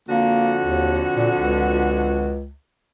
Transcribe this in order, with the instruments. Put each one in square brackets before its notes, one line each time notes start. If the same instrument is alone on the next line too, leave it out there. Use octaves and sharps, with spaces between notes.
[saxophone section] F2 D3 F#4 [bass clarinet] A#3
[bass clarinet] D#2
A#2
C#2